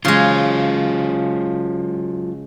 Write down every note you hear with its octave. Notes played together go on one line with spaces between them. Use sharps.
C#3 F#3 G#3 F4